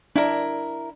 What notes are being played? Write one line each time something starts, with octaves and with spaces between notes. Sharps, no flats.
D4 E4 A#4